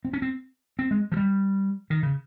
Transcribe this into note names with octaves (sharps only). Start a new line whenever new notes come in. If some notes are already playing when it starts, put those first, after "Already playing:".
C4
C#4
C4
C4
G#3
F3
G3
D#3
C#3